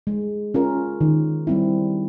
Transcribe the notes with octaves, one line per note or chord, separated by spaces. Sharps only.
G#3
C#4 F4 A#4
D#3
G3 C4 E4